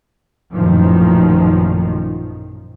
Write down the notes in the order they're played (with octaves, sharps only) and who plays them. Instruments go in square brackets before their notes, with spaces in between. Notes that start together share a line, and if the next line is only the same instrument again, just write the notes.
[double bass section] A1 F#2 A#2 D#3 F3